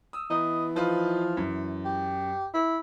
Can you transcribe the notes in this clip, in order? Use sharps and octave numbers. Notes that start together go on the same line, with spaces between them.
D#6 E6
E3 B3 D#5
F3 D#4 F4 B4
F#2
G4
E4